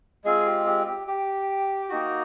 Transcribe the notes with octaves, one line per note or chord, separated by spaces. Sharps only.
G#3 C4 F4 G#4
G4
G4
G4
G4
A#3 D#4 F#4